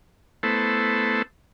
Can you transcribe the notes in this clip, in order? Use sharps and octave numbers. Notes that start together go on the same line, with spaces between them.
A3 B3 E4 A4 C5